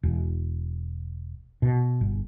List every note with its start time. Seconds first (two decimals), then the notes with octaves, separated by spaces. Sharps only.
0.03 E1
1.62 B2
2.01 G1